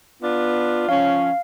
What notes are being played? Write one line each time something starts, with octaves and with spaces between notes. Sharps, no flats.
B3 D4 F4
F3 C#4 F5